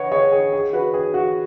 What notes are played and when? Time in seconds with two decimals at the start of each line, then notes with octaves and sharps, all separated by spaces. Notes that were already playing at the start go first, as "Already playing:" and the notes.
Already playing: B4 C#5 D#5 F#5
0.12 G#4 C#5
0.32 G#4
0.53 G#4
0.73 F#4 B4
0.94 G#4
1.14 F#4